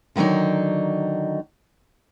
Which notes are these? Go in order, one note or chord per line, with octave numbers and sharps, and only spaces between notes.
D3 D#3 F#3 D4 D#4